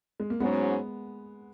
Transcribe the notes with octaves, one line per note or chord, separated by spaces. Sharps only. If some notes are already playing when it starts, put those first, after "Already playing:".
G#3
A#3
G#2 F#3 G#3 B3 C#4